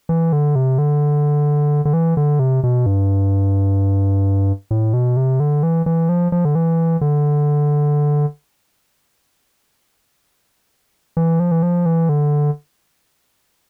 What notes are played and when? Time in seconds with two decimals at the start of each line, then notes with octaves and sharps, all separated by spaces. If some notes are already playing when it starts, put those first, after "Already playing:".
0.09 E3
0.33 D3
0.55 C3
0.78 D3
1.85 D3
1.93 E3
2.17 D3
2.39 C3
2.63 B2
2.86 G2
4.71 A2
4.93 B2
5.17 C3
5.40 D3
5.63 E3
5.86 E3
6.09 F3
6.32 F3
6.45 D3
6.55 E3
7.01 D3
11.17 E3
11.40 F3
11.51 E3
11.63 F3
11.86 E3
12.09 D3